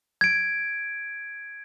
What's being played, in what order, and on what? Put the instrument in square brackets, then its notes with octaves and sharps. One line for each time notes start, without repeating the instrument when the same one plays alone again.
[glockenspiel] G#6 D7